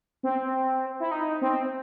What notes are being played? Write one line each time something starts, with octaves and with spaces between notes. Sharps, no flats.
C4
E4
D#4
C4